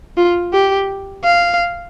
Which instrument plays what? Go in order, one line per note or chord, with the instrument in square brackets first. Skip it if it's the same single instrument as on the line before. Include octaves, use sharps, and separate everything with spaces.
[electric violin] F4
G4
F5